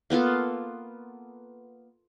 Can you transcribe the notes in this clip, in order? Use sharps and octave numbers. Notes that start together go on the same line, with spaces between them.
A#3 B3 F4 A4